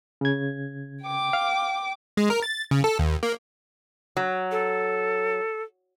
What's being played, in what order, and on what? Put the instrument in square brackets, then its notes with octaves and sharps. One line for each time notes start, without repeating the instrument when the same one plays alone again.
[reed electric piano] C#3 G#6
[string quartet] G5 D6
[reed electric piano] F5
[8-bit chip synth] G#3
A#4
A6
C#3
A4
D#2
A#3
[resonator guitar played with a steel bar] F#3
[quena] A4